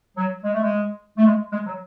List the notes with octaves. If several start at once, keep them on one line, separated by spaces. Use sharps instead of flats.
F#3
G#3
A3
G#3
A3
G#3
G#3
F#3